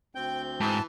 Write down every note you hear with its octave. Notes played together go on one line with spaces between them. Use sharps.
D2 C4 G5 G6
G#2 E3 A5